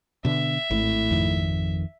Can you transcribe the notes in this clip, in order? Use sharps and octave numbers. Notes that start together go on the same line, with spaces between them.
B2 D3 E5
G#1 A2
F2 D#3